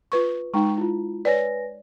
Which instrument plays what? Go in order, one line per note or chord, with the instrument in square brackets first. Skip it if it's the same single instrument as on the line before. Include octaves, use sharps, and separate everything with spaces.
[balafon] F4 B4 C#6
[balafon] G#3 D#4 [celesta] G5 A#5 C#6
[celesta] E4 F4
[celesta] B4 G#5 A#6 [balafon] C#5 D5